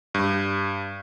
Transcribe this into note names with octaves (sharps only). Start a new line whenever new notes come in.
G2